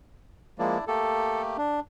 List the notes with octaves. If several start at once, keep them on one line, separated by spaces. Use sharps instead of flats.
F3 G#3 A#3 D4 E4 D5
A3 A#3 G4 A4
D4